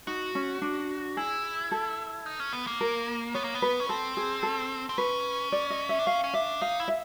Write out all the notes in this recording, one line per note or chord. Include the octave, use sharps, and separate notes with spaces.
D#4 F#4
C#4
D4
E4 G#4
A4
D#4
C#4
B3
A#3
A#4
B3 C#5
A#3
B3
B4
C#4
C4 A4
G#4
A4
C4
C#4 B4
D5
D#5
E5
D4
C#4 F5
C#4
D4 E5
D#4 F5
E4
E5